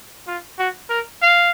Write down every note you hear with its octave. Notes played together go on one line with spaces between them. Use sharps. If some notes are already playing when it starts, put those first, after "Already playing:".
F4
F#4
A#4
F5